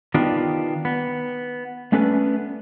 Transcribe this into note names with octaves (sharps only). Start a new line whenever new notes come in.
D#3 B3 D4 F4 G4
B3
A3 B3 C#4 D4 A4 B4